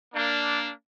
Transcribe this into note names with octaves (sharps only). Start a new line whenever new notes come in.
A#3 D4